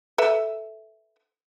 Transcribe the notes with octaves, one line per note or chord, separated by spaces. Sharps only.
A4 B4 E5